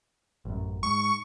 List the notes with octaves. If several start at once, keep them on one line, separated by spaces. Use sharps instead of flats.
A1 F#2
G#2 C#6